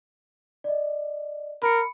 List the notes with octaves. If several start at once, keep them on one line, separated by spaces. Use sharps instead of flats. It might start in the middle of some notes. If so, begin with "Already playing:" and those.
D5 D#5
A#4 B5 C#7